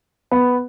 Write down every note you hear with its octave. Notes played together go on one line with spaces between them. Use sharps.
B3